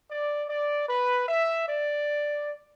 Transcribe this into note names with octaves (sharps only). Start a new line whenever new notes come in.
D5
D5
B4
E5
D5